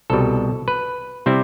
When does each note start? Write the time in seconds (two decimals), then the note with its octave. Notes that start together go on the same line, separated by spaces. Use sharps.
0.10 C2 B2 G3 A4
0.68 B4
1.26 C3 G3 C4 E4